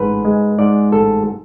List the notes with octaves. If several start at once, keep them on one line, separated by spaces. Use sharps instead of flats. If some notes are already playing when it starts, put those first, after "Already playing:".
Already playing: A1 G#2 B4
G#3
G#2 D5
A1 A4